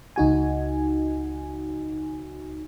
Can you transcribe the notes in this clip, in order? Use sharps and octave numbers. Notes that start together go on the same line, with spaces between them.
C#2 D#4 F#4 G#5